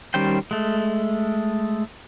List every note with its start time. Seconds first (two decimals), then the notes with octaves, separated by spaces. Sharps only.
0.14 D#3 G3 C#4 C5 G5
0.51 G#3 A3